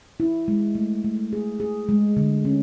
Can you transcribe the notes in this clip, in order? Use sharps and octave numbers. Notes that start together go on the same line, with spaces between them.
E4
G#3
A3
A3
G#4
G#4
G#3
D3
C#4